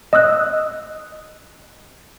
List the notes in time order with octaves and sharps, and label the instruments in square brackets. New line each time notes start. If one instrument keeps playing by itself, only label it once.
[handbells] D#5 D#6 E6 F#6